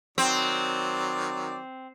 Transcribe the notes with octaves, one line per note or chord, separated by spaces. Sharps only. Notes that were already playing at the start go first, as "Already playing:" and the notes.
D#3 F#3 C4 D5